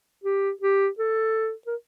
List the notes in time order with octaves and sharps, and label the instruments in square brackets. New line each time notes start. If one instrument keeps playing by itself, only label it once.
[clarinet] G4
G4
A4
A#4